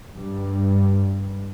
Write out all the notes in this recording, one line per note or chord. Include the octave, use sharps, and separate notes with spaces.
G2